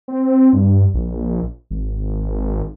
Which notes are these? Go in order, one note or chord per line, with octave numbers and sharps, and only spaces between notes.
C4
G2
A#1
G#1